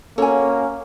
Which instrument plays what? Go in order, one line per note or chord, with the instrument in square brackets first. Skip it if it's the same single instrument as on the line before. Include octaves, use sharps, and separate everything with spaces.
[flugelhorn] A#3 [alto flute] C#4 [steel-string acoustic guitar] F#4 C#5 [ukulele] A4 G#5